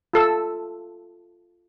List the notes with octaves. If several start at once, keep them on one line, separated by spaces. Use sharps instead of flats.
F4 A4 E6